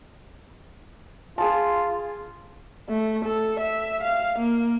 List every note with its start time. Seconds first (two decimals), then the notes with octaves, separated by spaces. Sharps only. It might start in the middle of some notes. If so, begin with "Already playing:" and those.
1.38 F4 G#4 A5
2.89 A3
3.25 A4
3.60 E5
4.03 F5
4.39 A#3